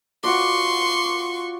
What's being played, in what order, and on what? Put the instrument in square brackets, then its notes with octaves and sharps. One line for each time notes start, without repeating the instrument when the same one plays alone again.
[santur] F4 F#4 D5 [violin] C6 C#6